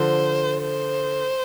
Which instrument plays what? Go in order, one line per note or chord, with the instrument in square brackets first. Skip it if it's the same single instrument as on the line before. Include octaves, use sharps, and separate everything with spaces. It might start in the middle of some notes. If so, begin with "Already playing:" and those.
Already playing: [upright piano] D3 F3 [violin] C5
[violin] C5